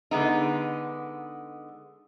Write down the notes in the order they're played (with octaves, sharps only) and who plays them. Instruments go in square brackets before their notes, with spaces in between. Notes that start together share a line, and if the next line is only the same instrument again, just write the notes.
[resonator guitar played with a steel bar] D3 G#3 B3 D#4